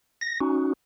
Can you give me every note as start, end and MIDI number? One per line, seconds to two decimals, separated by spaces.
0.21 0.40 94
0.41 0.73 61
0.41 0.73 63
0.41 0.73 66